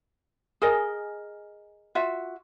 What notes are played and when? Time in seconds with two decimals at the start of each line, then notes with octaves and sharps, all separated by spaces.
0.62 G#4 A#4 D#5
1.95 F4 F#4 E5